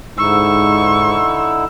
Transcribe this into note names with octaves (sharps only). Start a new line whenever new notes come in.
G#2 D3 D#4 E4 C#6 E6